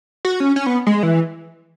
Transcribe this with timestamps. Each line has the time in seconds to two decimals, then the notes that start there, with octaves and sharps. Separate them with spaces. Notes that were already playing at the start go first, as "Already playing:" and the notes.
0.25 F#4
0.40 C#4
0.56 C#4
0.66 B3
0.87 G#3
1.03 E3